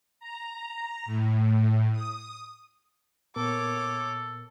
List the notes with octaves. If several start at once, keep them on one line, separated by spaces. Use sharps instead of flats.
A#5
A2
D#6
A#2 B3 A4 A#4 C#5 D6